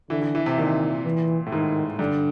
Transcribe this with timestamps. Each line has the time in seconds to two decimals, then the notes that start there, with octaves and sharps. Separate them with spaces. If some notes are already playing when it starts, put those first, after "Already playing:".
0.10 D3 E3
0.22 E3
0.35 E3
0.46 C3
0.58 A#2 D#3
1.05 E3
1.46 A2
1.52 G#2 D#3
1.99 G2 D3